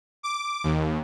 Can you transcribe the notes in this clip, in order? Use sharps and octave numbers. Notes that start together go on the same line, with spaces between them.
D6
D#2